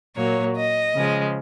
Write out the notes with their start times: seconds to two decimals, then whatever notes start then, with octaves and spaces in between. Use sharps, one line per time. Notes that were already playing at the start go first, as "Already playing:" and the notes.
0.16 A#2 F#3 A#3 C#5
0.56 D#5
0.95 C#3 F3 G#3